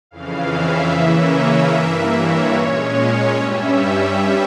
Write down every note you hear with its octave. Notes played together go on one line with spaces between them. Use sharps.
F2 C#3 E3 F5
E5
C#3 E3 A#3 C#4
G2 E3 A#3
C#5
A#2 G#3 C#4
G2 G3 C#4 E5